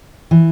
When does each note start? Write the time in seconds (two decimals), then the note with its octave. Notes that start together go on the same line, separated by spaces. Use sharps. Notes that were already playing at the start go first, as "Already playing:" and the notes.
0.31 E3